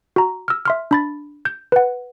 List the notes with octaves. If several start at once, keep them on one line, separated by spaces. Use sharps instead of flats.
F#4 A#5
E6 F6
E5 C6 F6
D4 B5 A6
G6
B4 F#5